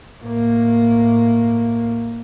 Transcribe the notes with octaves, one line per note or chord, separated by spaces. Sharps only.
A2 A#3